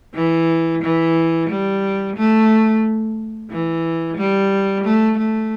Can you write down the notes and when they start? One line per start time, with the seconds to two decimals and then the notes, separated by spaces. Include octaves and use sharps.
0.15 E3
0.82 E3
1.49 G3
2.16 A3
3.50 E3
4.17 G3
4.84 A3
5.18 A3